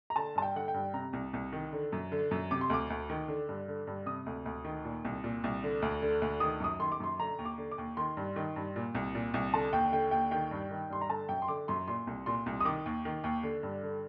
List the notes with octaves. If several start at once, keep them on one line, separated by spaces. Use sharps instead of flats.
A#5
D3 A5
G2 A5
G5
D3 F#5
G5
G2
C3 A#5
C2
C2
D#3
D3
F#2
D3
F#2
C3 D6
C6
D2 D6
D2
D#3
D3
G2
D3
G2
C3 D#6
D2
D2
D#3
A#2
C2
A#2
C2
D3
D2
D3
D2
D#3 D#6
F#2 D#6
D#3 C6
D6
F#2 C6
D3 A#5
D#2
D6
D3
D6
D#2
D#3 C6
G2
D#3
G2
A#2
C2
A#2
C2
D3 A5
D#2 G5
D3 G5
D#2 G5
D#3 G5
G2
D#3
G2 C6
A#5
D3 A5
F#2 G5
C6
D3 D6
F#2 C6
A#2 C6
C2
A#2 C6
C2
D#6
D#3 D6
D#2
D#3
D#2
D3
G2
D3